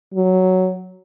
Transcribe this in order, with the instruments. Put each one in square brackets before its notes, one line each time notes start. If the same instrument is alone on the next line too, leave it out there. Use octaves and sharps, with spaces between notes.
[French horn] F#3